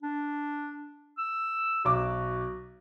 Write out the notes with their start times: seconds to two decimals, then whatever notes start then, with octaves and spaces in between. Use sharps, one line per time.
0.03 D4
1.18 E6
1.85 B1 F#4 D6